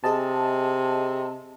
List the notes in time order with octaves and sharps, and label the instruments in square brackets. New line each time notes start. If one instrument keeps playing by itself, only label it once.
[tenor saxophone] C3 [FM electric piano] G#4 D#5 A5